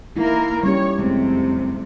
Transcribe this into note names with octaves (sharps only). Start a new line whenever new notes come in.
A#3 D#4 E4 A#4
G3 C#4 G4 C#5
F2 C3 G#3 A3